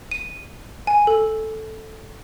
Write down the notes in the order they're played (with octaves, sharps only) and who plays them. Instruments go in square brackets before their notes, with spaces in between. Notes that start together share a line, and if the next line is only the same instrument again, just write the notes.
[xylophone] D#7
G#5
A4